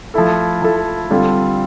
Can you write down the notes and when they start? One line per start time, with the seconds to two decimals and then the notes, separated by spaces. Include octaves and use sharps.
0.14 F3 A3 E4 A4
0.62 F3 A3 E4 A4
1.10 D3 G3 C4 F4 A4